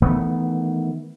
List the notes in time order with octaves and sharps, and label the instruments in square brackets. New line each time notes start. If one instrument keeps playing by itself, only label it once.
[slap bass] D#3 E3 A3 B3